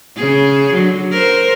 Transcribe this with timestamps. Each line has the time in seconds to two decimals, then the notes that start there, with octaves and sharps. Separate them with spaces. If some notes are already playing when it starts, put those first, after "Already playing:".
0.16 C#3 G#4
0.73 D3 F#3
1.12 A#4 C5